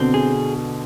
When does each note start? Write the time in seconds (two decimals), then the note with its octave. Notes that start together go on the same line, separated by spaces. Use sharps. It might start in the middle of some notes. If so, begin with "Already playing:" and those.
Already playing: B2 D3 C4
0.14 G#4